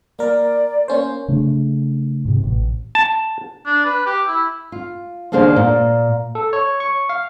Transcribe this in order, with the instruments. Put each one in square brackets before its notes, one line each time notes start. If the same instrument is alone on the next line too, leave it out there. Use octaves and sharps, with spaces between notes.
[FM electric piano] A#3 A#4 [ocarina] D5
[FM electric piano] A#3 C#4 C5
[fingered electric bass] C#3 A3 D4
G#2 C3
A1
[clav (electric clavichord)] A5
[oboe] D4
B4
G4
E4
[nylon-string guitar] F4
D#2 C#3 A#3 D4 C5
A#2
[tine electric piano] A4
C#5
C#6
F5